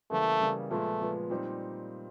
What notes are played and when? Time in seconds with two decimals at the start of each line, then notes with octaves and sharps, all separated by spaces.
0.10 C#3 E3 G3 A3 A#3
0.41 C#3 E3 G3 A#3
0.71 A#2 F3 G#3 A3 B3
1.01 A#2 F3 G#3 B3
1.30 A#2 G3 C4 D#4